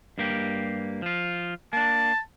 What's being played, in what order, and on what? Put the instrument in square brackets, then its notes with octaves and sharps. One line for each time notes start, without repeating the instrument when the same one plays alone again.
[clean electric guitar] G2 A#3 G4
F3 F4
[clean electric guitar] A#3 D4 [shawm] A5